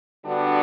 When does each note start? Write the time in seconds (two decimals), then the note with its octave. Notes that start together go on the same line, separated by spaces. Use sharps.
0.25 D3 G3 B3 D4 F#4